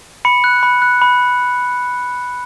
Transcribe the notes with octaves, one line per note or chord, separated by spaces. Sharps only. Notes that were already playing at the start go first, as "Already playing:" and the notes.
B5 C#7
F#6
B5
F#6
B5